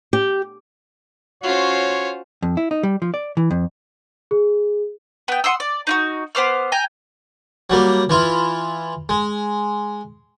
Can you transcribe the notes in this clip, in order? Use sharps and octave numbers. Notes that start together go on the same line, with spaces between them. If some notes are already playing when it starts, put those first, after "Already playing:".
G4
C#4 F4 F#4 C5 C#5
F2
E4
D#4
G3
F3
D5
E3
F2
G#4
B3 G5
F#5 C6 D#6 E6
D5
D#4 F4 F#4
B3 C5 D6 F6
G5 G#5 A#5
F#3 G3 A#3
E3 E4 F4
G#3